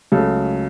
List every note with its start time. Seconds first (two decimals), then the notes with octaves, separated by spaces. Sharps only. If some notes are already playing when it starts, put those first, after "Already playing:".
0.12 C#2 C#3 F#3 A3 A4